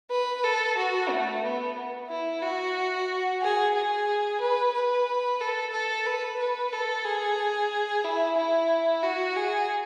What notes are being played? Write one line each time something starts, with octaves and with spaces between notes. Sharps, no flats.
B4
A4
F#4
A3
B3
E4
F#4
G#4
G#4
B4
B4
A4
A4
B4
B4
A4
G#4
E4
E4
F#4
G#4